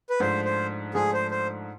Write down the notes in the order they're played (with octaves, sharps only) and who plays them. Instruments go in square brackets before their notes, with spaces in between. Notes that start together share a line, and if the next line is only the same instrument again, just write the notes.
[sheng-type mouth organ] B4
[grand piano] G#2 F3 A3 D4 F4 [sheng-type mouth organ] C5
[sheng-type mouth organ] C5
[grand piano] G#2 F3 A3 D4 F4 [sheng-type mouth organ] G#4
[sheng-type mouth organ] C5
C5